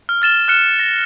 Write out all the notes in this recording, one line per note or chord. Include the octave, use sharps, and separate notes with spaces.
F6
F6 A6 E7 G7
F6 F#6 C#7 E7
A#6